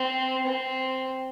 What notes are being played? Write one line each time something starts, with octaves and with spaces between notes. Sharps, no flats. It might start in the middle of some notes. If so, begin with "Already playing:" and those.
Already playing: C4
C4